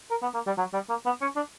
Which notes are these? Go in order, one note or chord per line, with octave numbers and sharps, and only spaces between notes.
A#4
B3
A#3
G3
F#3
G3
A#3
B3
C#4
D4